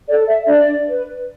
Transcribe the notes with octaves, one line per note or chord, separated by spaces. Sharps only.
A4 D5
E5
D4 D5
B4